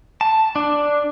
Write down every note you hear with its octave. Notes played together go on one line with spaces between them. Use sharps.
A5
D4